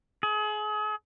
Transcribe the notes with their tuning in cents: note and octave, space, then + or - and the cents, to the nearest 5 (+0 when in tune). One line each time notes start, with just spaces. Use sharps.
G#4 +35